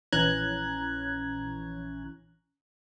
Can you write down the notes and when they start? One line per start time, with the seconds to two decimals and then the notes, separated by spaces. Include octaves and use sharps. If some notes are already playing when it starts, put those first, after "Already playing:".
0.12 A#1 E3 C#4 A#5 F#6 G#6